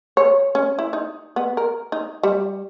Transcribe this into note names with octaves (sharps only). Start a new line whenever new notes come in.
C#5
C#4
E4
D#4
B3
A#4
D#4
G3